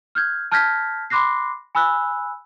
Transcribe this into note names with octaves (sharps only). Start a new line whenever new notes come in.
F6 G6 G#6
A5 F6 G6 G#6 A#6 B6
B5 C6 D6 F#6 A#6 C7
G#5 B5 E6 F#6